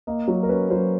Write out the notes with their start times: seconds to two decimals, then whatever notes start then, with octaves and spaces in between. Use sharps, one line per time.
0.07 A#3 D#5
0.28 F#3
0.43 A#4
0.49 C#4 B4
0.70 F#3 C5